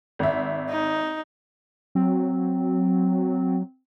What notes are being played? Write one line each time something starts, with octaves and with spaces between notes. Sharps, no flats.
G#1 E5
D#4
F#3 C4